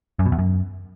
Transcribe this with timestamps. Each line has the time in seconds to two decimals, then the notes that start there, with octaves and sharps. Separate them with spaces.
0.19 F#2
0.26 B2
0.32 E2
0.39 F#2